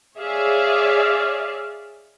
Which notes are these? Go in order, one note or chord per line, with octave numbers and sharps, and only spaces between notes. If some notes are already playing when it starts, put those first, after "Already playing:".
G#4 C#5 D5 E5 F5